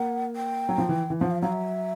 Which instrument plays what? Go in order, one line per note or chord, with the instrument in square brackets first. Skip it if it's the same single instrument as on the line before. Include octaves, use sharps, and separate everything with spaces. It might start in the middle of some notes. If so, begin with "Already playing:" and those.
Already playing: [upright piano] A#3 [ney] F#5
[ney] G5
[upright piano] F#3
F3
E3
E3
[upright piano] F3 [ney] F#5
[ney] F5
[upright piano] F#3 [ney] F5
[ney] E5